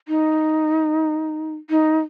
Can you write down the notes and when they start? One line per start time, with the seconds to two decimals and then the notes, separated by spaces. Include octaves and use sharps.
0.08 D#4
1.70 D#4